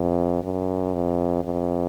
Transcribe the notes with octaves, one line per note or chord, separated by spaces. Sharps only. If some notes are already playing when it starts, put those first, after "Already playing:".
Already playing: F2
F#2
F2
F2